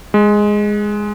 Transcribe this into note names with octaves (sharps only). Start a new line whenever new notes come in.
G#3